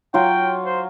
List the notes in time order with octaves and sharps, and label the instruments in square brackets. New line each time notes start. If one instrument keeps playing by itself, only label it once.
[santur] F#3 F4 F#4 [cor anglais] G5
[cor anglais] C5